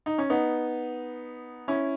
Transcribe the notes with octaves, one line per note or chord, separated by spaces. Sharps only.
D#4
C#4
B3 D#4
C#4 E4